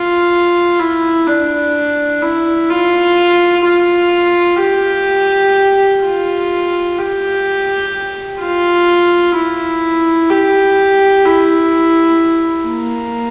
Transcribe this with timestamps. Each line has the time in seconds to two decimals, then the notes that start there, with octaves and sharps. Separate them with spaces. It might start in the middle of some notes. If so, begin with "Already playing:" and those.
Already playing: F4
0.80 E4
1.27 D4
2.22 E4
2.70 F4
3.65 F4
4.60 G4
6.03 F4
6.98 G4
8.40 F4
9.35 E4
10.31 G4
11.26 E4
12.68 A#3